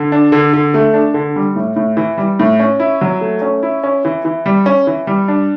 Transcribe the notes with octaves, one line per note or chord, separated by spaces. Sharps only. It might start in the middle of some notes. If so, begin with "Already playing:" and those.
Already playing: D3
D4
D3
D3
A3
D4
D3
G3
A2
A2
E3
G3
A2
C#4
E4
F#3
A3
C#4
E4
C#4
E3
E3
G3
C#4
E3
G3
D4